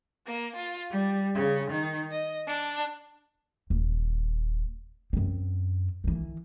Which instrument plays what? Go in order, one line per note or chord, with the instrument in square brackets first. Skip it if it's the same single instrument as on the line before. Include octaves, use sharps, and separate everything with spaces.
[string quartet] A#3
F4
G3
C#3
D#3
D#5
D4
[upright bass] D#1
F#2 C4
D#3 E3